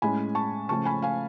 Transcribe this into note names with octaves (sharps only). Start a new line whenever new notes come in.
A2 G#3 C#4 G#5 B5
A5 C#6
C#3 F3 A3 C#4 A5 C#6
G#5 B5
F5 G#5